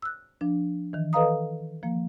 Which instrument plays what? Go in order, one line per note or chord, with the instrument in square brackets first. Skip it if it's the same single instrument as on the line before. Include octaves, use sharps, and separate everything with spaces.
[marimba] E6 F#6
F3 D4
D#3 E3
A4 B4 D#5 F5 A#5 D#6
F3 A#3